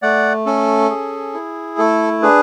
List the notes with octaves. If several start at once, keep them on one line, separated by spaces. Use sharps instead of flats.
A3 D5 F#5
C#4 A4
G#4
E4
A3 A4
D4 G#4 B4